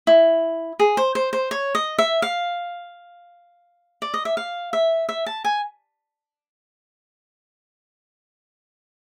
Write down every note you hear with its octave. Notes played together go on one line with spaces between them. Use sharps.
E4
G#4
C5
C5
C5
C#5
D#5
E5
F5
D5
D#5
E5
F5
E5
E5
A5
G#5